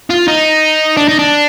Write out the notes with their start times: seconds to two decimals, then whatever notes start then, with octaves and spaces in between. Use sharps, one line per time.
0.10 F4
0.28 D#4
0.97 D4
1.08 D#4
1.19 D4